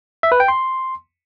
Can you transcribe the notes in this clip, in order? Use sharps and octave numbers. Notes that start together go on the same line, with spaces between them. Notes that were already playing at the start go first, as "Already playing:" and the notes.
E5
B4
G5
C6